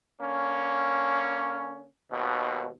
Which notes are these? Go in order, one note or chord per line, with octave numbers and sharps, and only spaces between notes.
D3 A#3 C#4
G#1 D#2 B2